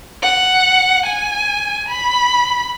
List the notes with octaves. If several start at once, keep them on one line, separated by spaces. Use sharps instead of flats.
F#5
G#5
B5